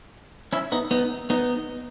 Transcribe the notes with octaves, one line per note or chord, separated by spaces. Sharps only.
C#4 E4
B3 D#4
B3 D#4
B3 D#4